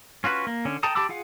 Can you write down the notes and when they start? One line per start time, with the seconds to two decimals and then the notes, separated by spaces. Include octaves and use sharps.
0.24 C#4 F4 F#4 B4
0.47 A#3
0.65 D3 C#4
0.83 A4 G5 A5 A#5 D#6
0.95 G4 A5 B5 D6 E6
1.09 F4 G#4 F5 F#5